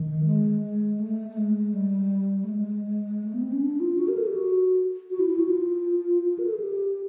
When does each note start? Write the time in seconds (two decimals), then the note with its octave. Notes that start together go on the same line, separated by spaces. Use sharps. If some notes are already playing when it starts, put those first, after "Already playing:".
Already playing: D#3
0.25 G#3
0.61 G#3
1.00 A3
1.29 A3
1.37 G#3
1.73 G3
2.44 A3
2.48 G#3
3.23 A3
3.33 B3
3.42 C4
3.52 C#4
3.61 D4
3.80 F4
3.99 F#4
4.08 A#4
4.18 A4
4.26 G4
4.35 F#4
5.10 F#4
5.19 E4
5.30 E4
5.39 F#4
5.49 F4
6.23 F4
6.39 A#4
6.46 A4
6.53 G#4
6.60 G4